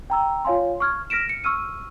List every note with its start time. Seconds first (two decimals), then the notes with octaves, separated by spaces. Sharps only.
0.10 G5 A#5 E6
0.45 F4 C#5 F5 G#5 C6
0.80 C#6 F6 G#6
1.10 F6 A#6 B6 D7 E7
1.29 C#7
1.44 C#6 E6 F6 D#7